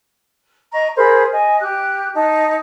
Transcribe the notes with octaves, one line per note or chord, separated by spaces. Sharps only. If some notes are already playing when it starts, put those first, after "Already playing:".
D#5 A#5 C#6
G#4 A#4 C5 B5
D#5 G#5
G4 F#6
D#4 A5